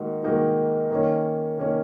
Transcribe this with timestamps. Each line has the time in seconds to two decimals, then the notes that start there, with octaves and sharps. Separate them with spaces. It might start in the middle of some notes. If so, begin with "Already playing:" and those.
Already playing: G#2 D#3 A#3 D#4 F#4
0.23 G#2 D#3 A#3 D#4 F#4
0.91 D#3 A#3 C#4
1.58 D#3 A#3 C#4